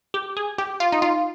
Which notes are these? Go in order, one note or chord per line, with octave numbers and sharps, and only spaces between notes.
G4
G#4
G4
F4
D#4
F4